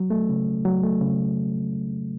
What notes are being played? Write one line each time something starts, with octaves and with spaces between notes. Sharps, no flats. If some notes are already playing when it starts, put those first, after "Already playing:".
Already playing: F#3
A3
C#3
C#2
F#3
A3
C#3